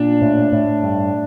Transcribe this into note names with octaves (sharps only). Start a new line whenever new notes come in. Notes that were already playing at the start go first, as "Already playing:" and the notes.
Already playing: A#2 D4
A2
A2
G2